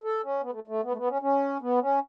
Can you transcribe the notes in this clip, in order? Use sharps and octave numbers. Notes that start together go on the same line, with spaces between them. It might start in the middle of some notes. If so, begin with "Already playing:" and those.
A4
C#4
B3
A3
A3
B3
A3
B3
C#4
C#4
B3
C#4